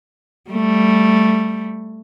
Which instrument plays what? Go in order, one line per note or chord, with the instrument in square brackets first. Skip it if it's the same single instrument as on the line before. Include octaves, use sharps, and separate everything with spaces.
[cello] G3 A3